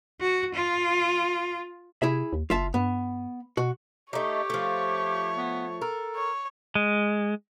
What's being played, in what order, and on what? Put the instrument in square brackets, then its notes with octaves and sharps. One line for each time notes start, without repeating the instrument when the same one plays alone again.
[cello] F#4
F4
[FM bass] C3 [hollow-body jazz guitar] E4 G#4 E5
[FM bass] D#2
[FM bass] F#1 [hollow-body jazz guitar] F4 E5 A5
[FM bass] G2 [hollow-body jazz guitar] B3
[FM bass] B2 [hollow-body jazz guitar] F#4
[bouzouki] A3 D#4 [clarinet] G4 [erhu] C#5
[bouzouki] F3 A3
[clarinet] B3
[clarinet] A4 [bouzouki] A#4
[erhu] C#5
[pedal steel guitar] G#3